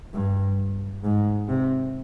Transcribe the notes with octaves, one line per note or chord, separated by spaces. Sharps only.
G2
G#2
C3